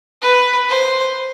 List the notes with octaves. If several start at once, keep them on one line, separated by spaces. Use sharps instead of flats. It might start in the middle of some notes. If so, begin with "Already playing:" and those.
B4
C5